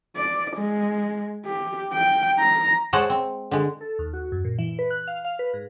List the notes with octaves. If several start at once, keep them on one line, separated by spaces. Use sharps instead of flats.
D5
G#3
G4
G5
A#5
G#3 C5 C#5 D#5 F#5 A5
C4
D3 G#3
A4
D#2
F#4
F#2
A#2
E3
B4
F#6
F5
F5
B4
G#2